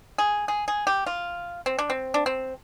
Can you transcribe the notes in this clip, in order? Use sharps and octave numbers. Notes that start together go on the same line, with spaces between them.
G#4
G#4
G#4
G4
F4
C4
D4
C4
D4
C4